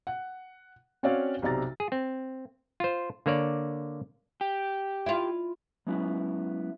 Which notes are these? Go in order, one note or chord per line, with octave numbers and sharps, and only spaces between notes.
F#5
C4 C#4 F#4 C#5 D5 F5
B1 C3 D5 A#5 A6
G#4
C4
F4 C5
D3 A#3 C#5 D5
G4
E4 F4
F#3 G#3 B3 C#4 E4 F#4